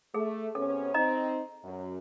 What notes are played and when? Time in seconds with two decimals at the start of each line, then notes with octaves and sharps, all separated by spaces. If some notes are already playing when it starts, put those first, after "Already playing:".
0.14 A3 G#4
0.55 C3 B3 C#4 A4
0.94 C4 D#4 D#5 A#5
1.63 F#2